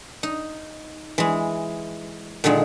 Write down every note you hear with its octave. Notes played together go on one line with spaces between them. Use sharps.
D#4
E3 G#3
A#2 D3 D#3 G#3